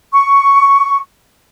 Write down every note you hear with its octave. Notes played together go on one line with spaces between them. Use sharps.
C#6